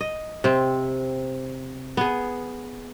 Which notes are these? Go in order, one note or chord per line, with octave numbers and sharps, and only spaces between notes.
D#5
C3 C4
B3 G#4